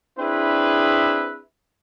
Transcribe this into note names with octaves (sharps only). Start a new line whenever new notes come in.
C4 D4 E4 G#4 B4 E5